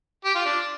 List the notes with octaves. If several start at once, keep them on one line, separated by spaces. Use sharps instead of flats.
G4
F4
D4